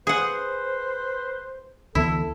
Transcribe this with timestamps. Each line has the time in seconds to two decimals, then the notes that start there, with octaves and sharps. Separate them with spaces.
0.07 G#4 B4 C5 F#5
1.95 D2 E3 B3 E4 A4